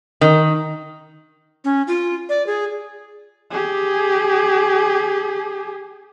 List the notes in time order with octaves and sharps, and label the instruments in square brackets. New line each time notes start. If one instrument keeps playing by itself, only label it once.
[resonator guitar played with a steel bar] D#3
[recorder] C#4
F4
D5
G#4
[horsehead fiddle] G4 G#4